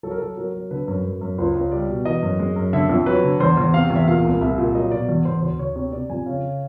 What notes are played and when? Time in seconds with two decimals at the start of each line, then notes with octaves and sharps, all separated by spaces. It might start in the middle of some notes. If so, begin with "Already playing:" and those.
0.03 F#3 A4
0.11 A#4
0.18 F#3 A4
0.37 F#3 A#4
0.54 F#3
0.71 D3 B4
0.88 F#2
1.05 F#2
1.21 F#2
1.38 C#2 C5
1.55 C#2
1.72 G3 D5
1.89 B2
2.05 E3 D#5
2.22 F#2
2.39 G#3
2.56 F#2
2.73 D3 E5
2.89 F2
3.06 F#3 B4
3.23 D3
3.40 E2 C5
3.57 E2
3.74 C3 F5
3.90 E2
3.96 E5
4.07 A#2 F5
4.25 C2
4.41 C2 E5
4.58 A#2
4.75 F#3 D#5
4.92 B2 D5
5.09 E2
5.25 E2 C5
5.42 D2 C5
5.59 D2 C#5
5.76 C3 C#5
5.92 C3 D5
6.10 F2 G#5
6.26 C#3